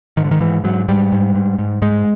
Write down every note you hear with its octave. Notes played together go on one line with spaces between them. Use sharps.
G#2 D#3
D3
D#3
G#2 E3
G#2 F#3
G#2 G3
G#2
G#2
G#2
G#2 G#3